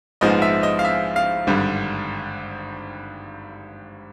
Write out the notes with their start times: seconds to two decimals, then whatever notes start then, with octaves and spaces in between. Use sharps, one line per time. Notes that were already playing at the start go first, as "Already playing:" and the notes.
0.21 A#1 G#2 F3 G#3 B3 D#5
0.42 E5
0.63 D#5
0.79 F5
0.85 E5
1.16 F5
1.47 G#1 G2 D3 G3